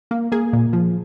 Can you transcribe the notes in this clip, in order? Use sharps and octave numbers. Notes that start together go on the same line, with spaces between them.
A#3
A#3 G#4
A#2
F3